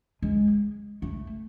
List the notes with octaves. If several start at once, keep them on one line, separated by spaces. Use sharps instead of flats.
G#3
A3